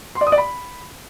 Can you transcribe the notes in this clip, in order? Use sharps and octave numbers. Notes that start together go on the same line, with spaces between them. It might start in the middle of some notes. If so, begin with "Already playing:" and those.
C6
D5
D#6
D5
B5